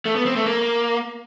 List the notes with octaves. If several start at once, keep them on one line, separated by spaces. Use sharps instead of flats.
A3
B3
C4
A3
A#3